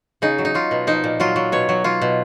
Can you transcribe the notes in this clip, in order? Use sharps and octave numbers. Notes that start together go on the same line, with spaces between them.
C#3 D#4
F#3
D#4
F#3 F4
B2
F3 D#4
A#2
F#3 F4
F#3
B2 C#5
F#3
F#3 F4
B2